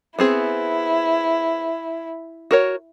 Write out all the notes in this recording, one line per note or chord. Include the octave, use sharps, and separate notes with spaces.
B3 C4 E4 G#4
F#4 A#4 C#5